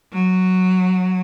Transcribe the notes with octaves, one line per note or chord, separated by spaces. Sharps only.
F#3